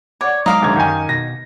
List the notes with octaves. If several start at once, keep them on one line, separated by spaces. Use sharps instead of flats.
C#5 D5 F#5 D6
F#3 G#3 D#4 F5 D6
D#1 D2 G#6
F#2 D#3 G5 G#5
B2 A#6